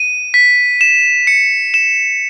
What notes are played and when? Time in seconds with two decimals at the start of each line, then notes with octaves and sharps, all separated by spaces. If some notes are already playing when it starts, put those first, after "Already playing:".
Already playing: D#7
0.34 B6
0.81 E7
1.27 C#7
1.74 E7